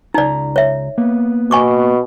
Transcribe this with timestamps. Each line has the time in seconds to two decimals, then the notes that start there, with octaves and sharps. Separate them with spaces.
0.14 C#2 D#4 D5 A#5
0.56 C#5 E5
0.98 A#3 B3
1.51 B2 G#5 C#6 D6